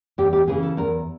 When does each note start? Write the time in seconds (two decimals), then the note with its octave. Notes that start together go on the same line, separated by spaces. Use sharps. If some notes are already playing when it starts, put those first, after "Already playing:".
0.18 E2 G4
0.33 G4
0.48 C#3 E3 G#4
0.63 A4
0.77 E2 A#4